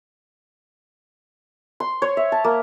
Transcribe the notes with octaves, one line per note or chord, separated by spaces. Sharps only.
C6
C#5
E5
A5
A#3